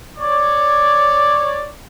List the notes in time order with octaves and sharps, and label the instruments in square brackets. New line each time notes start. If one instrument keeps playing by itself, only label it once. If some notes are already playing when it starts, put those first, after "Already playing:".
[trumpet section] C#5 D5